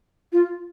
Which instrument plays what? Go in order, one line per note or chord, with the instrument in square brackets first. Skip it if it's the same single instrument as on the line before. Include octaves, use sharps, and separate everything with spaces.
[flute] F4